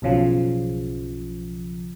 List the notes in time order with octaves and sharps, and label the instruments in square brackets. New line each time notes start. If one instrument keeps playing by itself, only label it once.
[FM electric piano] B1 F#2 C#3 F3